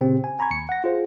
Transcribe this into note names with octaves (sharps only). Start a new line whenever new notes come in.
A#2 C#3 C4 G4
G#5
G#5 A#5 B5 C#6 G#6
D#2 C#7
F#5 A#6
F4 G#4 C5